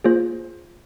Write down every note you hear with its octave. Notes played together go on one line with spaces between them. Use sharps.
A#3 F4 G#4 C5